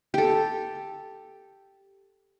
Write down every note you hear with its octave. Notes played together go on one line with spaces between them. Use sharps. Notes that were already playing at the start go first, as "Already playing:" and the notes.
G4 A4